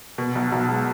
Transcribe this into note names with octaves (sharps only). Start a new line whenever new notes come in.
B2
B1
B1
G#3